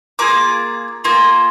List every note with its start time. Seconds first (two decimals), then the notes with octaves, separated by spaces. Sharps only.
0.19 A#3 F4 G#4 D6
1.04 A#3 F4 G#4